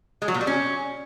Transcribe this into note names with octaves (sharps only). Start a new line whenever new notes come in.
G#3
F#3
A#2
G3
C#4